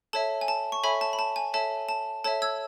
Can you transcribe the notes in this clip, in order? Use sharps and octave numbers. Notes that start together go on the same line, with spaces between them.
A4 C#5 E5 A5
G#5
A5
C#6
A4 C#5 E5 G#5 B5
A5
B5
A5
G#5
A4 C#5 E5 A5
A5
A4 C#5 E5 A5
E6 G#6